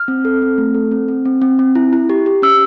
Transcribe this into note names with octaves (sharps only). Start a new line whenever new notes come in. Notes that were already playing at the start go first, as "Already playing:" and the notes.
Already playing: F6
C4
A4
C4
A3
A4
C4
C4
C4
C4
C4
E4
E4
G4
G4
C#4 E6